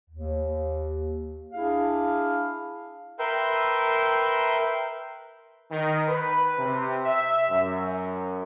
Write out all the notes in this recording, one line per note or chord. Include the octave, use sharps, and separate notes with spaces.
D#2
D4 E4 G#4 F5
A#4 B4 E5 G5 C6
D#3
B4
C3
E5
F#2